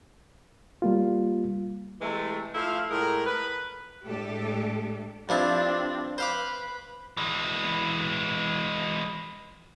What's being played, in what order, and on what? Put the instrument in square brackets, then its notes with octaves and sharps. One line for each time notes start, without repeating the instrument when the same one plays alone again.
[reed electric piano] G3 A#3 F4
[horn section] C3 E3 G#3 A3
F3 A3 E4 F5
A2 G#3 A#4
B4
[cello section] A2 G#3 A3 D4 G4 A4
[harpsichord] G2 F3 E4 [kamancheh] C4 D4
[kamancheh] B4 [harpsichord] C5 F5 D6
[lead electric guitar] E3 G#3